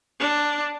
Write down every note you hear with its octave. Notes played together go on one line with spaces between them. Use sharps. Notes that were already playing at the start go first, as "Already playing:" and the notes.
D4